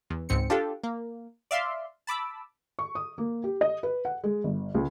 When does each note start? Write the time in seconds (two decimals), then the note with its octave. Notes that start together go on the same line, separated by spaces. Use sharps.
0.10 E2
0.29 C#2 G#2 C4 C#7
0.50 D4 F4 G4 A4
0.83 A#3
1.51 D5 E5 F5 C6
2.07 A5 B5 D6 E6
2.79 C#6
2.95 D#6
3.18 A#3
3.44 G4
3.61 D#5
3.83 B4
4.05 F#5
4.24 G#3
4.44 G1
4.75 C#2